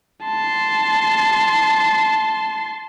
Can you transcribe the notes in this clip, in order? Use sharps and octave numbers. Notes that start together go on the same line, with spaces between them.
A5 C6